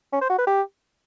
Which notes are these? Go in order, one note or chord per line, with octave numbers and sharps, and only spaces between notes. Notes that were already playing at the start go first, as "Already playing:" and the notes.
C#4
C5
F#4
B4
G4